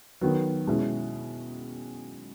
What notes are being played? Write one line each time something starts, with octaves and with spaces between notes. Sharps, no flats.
D#3 F#3 B3
B2 G#3 C#4 E4